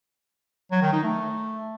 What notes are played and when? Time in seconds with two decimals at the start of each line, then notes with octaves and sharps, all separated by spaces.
0.71 F#3
0.82 D#3
0.93 D#4
1.03 A3